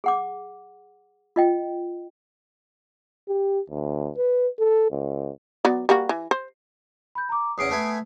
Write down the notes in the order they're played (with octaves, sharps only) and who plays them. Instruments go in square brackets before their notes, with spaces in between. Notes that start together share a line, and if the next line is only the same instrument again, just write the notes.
[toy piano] G#4 F#5 D6
F4 D#5 G5
[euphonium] G4
D2
B4
A4
C#2
[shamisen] F#3 B3 D5
G3 A#3 F#4
E3
C5
[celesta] B5 G6
A#5 D6
[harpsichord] E2 C#4 F#5 [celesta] D#6 C7 D7
[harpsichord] A3 B3 G#5